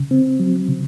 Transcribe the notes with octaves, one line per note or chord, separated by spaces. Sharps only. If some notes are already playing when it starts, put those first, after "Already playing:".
Already playing: C#3
C4
F#3
C#3